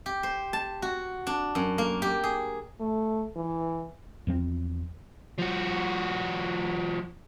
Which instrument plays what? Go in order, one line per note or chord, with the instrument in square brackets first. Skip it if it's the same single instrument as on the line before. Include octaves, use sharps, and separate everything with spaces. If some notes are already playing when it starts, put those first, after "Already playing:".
[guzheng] G4
C5
A5
F#4
D4
F#2
A#3
G4
G#4
[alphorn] A3
E3
[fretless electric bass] E2 F3 C4
[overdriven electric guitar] F3 F#4